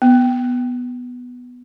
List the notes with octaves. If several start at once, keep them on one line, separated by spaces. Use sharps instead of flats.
B3